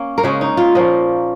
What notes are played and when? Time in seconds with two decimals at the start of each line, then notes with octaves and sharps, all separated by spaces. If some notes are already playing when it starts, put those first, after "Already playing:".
Already playing: A#3 C#4
0.18 A#4
0.23 C#3 G#3 C#4 G#4
0.41 D#4
0.57 F4
0.75 A#2 F3 A#3 C#4 D#5